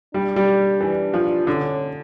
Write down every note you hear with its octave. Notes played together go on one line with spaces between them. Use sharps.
G3 D4
G3
E3
F3
D3 C#4